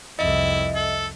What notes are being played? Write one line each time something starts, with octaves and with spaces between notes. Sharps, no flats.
C2 F2 E4 D#5 E5
A4